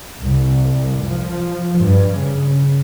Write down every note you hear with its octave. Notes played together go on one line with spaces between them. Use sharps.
C2
F3
G2
C#3